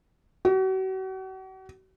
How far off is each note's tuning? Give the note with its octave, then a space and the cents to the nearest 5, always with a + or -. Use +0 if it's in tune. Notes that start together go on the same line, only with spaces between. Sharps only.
F#4 +40